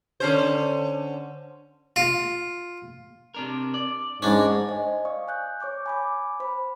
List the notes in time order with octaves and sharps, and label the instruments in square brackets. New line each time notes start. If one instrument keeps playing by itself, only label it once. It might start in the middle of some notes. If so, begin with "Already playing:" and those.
[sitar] D3 C#4 C5
[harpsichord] F4
[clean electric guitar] C3 D4 A#4
D5
[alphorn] G#2 [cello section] G#3 [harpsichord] C#4 D4
[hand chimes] C5 D#5 G#5
D5 F5 C#6 D#6
G#5 F#6 G6
C#5 C#6 D6 G6
G#5 B5 D6
C5 B5